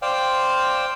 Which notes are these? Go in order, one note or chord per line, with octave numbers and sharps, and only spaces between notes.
C5 D5 F5 G5